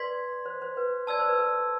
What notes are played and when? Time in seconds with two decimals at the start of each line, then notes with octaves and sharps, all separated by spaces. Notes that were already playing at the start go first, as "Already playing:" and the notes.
Already playing: B4 D5 C6 G#6 B6
0.46 C5
0.62 C5
0.77 B4
1.07 D5 A5 E6 G#6
1.19 C5
1.28 B4
1.38 A4